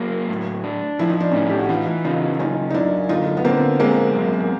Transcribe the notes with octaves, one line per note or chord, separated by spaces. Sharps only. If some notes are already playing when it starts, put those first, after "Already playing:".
Already playing: F#3 A#3
A2
D4
F3 E4
D#4
D4
A2 C#4 D#4
G4
F#4
E3 D#4 F4
C#3 D#4 F4
F#2 C#4 D#4
D#4
F#2 D4 E4
D3 D#4 F4
B3
D3 A#3 C4
G#3 A#3 C4
F#2